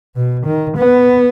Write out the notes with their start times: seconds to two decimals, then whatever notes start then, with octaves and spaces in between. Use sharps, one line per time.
0.16 B2
0.46 D#3
0.77 B3